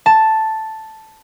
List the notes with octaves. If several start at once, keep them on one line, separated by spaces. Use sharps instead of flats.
A5